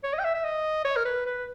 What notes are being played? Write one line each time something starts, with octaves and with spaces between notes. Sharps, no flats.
C#5
D#5
G5
E5
E5
D#5
C#5
A#4
B4
B4